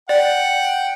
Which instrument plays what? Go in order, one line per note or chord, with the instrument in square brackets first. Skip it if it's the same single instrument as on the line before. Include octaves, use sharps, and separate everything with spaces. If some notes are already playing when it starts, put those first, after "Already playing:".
[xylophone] D5 [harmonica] F#5 G5